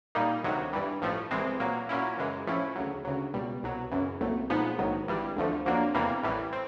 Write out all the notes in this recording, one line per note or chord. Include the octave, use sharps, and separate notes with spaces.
A#2 G3 A#3 D#4
D2 C3 D#3 F#3
G2 E3 G3
A1 A2 F3 A3
C2 C3 E3 G#3 C4
A#2 F#3 A#3
A#2 F#3 A#3 C#4 E4
F#2 C#3 E3 G#3
A2 F3 A3 C#4 E4
D2 C#3 F#3
D2 C#3 F#3
C#2 B2 G3
C2 B2 F#3
F#2 C#3 E3
C2 A#2 F#3 A3
A#2 F3 G#3 B3 D#4
A#1 G#2 D#3 F#3
G#1 G2 E3 G3
D2 D3 F3 A3
F2 D3 F#3 A#3 D4
E2 C3 E3 G3 A#3
A1 A2 E3 G3
C4